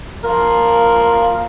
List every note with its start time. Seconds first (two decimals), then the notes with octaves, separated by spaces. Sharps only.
0.23 F3 A#3 F4 A#4